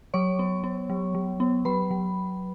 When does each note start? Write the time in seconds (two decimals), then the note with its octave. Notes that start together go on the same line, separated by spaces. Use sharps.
0.14 F#3 C#5 C#6
0.39 B3
0.64 B3
0.89 F#3
1.15 F#3
1.40 B3
1.65 F#3 B4 B5
1.91 F#3